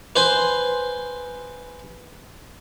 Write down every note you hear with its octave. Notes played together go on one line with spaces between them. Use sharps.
B4 C5 G#5